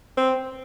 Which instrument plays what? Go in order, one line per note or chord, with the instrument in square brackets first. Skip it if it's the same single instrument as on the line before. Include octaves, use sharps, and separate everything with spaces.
[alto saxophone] C4